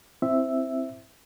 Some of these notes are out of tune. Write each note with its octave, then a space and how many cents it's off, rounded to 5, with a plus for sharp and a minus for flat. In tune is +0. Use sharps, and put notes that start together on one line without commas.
C4 +0 E4 +0 E5 +0